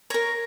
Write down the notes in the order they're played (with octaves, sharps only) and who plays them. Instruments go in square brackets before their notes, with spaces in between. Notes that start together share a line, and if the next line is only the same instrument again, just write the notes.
[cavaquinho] A#4 C#5 A#5